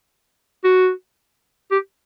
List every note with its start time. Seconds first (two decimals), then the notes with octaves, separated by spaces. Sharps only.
0.64 F#4
1.71 G4